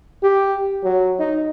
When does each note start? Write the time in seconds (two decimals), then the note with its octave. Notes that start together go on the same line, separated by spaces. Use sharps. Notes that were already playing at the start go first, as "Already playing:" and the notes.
0.23 G4
0.84 F#3
1.19 D#4